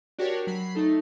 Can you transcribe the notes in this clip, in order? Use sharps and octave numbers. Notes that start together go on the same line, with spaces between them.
D4 F#4 G4 A#4 C#5
F#3 B5 C7
A3 D#4 A4